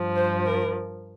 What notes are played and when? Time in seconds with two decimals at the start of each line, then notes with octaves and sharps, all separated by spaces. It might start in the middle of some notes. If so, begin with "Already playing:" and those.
Already playing: G2 F3
0.16 C5
0.45 A#4